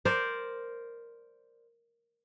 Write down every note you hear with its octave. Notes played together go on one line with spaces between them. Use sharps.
A#4 C5 D5